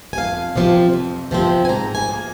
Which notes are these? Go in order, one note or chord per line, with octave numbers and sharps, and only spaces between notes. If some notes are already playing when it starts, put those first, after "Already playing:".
G#5
F2 F5
C3 F3 C4
F2
C3 F3 C4
G#5
G#2 A#5
G#5
F3 A#3